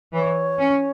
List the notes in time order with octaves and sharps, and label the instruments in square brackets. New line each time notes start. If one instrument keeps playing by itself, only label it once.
[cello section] E3 [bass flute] C#5
[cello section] C#4